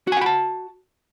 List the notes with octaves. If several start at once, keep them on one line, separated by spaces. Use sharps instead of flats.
F#4 F#5 G#5 A5 B5